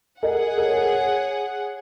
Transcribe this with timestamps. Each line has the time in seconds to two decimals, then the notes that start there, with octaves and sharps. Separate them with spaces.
0.22 G#4 A#4 D#5 F#5
0.58 A#4
0.64 C#5
0.72 A#4
0.92 C#5